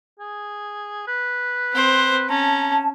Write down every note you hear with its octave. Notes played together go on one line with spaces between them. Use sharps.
G#4
B4
C4 C5
C#4 A5 A#5